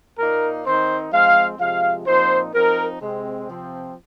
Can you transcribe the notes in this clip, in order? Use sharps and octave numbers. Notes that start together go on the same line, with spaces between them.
A#2 A#3 D#4 A#4
D#3 C4 D#4 C5
F3 G#3 C4 F5
C3 F3 G#3 F5
A#2 F3 C4 D#4 C5
F3 C4 D#4 A#4
C3 G#3 C4
C3 F3 C4